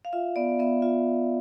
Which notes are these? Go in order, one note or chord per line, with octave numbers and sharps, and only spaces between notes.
F5
F4 E5
B3 D5
B3 E5
F4 E5